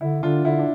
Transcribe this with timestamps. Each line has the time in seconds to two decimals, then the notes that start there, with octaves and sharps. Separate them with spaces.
0.01 D3 E4
0.23 D3 D4 F4
0.45 D3 E4
0.59 D4